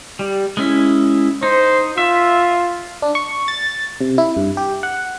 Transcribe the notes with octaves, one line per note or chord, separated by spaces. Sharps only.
G3
G#3 C#4 E4
D#4 C5
F4 E5
D4
C#6
A6
C3
E4
G2
G4
F#5